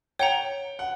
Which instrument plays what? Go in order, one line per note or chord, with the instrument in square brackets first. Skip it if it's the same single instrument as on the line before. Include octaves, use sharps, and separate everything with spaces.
[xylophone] C#5 F#5 A#5 [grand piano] G5
[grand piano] F#5